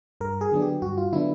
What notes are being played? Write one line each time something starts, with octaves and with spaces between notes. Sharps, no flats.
G2 A#4
G#4
D3 F#3 B3 D4
G4
G2 F#4
F4
D3 F#3 B3 D4 E4